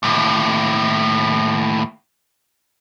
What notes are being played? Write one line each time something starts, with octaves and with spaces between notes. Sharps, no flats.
D#2 A2